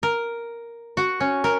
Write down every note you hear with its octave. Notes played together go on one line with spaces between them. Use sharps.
A#4
F#4
C#4
A#4